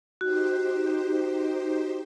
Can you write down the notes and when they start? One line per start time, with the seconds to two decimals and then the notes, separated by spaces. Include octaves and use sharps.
0.21 D#4 F#4 G4 C5